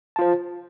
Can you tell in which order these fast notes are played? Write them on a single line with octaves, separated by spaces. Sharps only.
A5 F4 C5